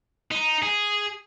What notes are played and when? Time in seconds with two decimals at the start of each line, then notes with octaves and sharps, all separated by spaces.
0.31 D#4
0.63 G#4